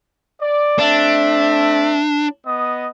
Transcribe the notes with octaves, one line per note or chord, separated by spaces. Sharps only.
D5
A3 C4 D4 E5
B3 D#5 D#6